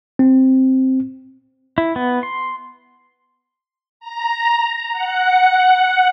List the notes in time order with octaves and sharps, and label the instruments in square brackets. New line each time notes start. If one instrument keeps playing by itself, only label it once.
[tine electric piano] C4
[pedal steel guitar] E4
B3
C6
[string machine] A#5
F#5